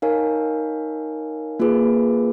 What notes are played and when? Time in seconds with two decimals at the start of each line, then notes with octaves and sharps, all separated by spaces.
0.02 D#4 A#4 C#5 F5 G#5
1.59 A#3 F4 G#4 B4